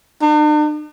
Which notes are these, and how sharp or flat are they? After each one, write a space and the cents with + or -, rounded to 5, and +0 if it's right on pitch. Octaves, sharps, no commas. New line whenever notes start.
D4 +45